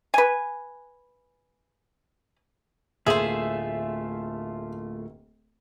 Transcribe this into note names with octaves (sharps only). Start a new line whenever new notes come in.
B4 G#5
D1 A3 A#3 F4 G#4 C5 E5